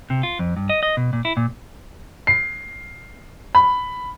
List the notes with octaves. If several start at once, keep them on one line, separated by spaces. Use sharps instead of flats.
C3
F4
F2
G2
D#5
D#5
B2
A#2
E4
A#2
C7
B5